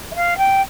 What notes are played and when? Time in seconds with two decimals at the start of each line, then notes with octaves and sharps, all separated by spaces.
0.12 E5
0.15 F5
0.38 G5